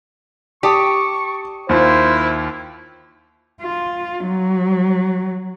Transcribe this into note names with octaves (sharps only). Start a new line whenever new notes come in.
G4 D5 A5 C#6 D#6
D#2 E4 F4 C5
F4
F#3